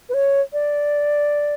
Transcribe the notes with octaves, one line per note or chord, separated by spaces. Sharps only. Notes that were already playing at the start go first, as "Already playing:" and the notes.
B4
C#5
D5